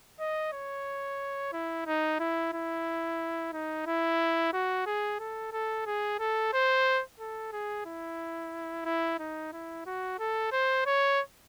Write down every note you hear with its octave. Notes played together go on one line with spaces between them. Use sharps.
D#5
C#5
E4
D#4
E4
E4
D#4
E4
F#4
G#4
A4
A4
G#4
A4
C5
A4
G#4
E4
E4
D#4
E4
F#4
A4
C5
C#5